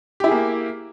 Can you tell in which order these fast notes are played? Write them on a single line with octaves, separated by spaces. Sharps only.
G4 E4 G#4 A#3